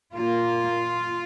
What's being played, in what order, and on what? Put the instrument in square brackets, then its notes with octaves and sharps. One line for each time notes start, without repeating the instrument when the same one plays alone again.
[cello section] A#2 A#3 F4